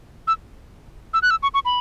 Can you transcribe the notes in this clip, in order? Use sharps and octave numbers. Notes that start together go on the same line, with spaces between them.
E6
E6
F#6
E6
C#6
C#6
B5